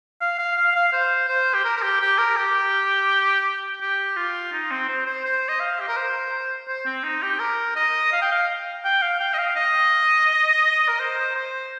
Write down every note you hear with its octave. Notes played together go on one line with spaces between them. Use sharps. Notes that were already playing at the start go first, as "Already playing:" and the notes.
F5
F5
F5
F5
C5
C5
G4
A#4
A#4
G4
G4
A#4
G4
G4
F4
D#4
C4
C5
C5
C5
D#5
F5
G4
A#4
C5
C5
C4
D#4
G4
A#4
D#5
F5
G5
F5
G5
F5
G5
D#5
F5
D#5
A#4
C5
C5